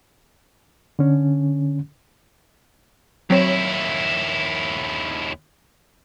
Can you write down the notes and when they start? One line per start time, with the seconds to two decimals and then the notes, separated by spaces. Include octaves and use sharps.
0.99 D3 C#4
3.30 D#2 F#3 C4 E4 C#5